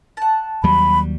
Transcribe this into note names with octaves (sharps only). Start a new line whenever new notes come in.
F#5 A5
D#2 F#3 G3 B5